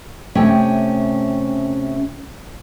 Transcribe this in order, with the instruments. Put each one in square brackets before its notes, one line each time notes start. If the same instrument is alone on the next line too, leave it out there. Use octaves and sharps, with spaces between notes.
[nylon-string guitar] C3 A3 C#4 G5